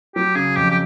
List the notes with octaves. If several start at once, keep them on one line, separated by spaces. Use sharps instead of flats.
F#3 G4
C#3 G#4
F2 G4
G4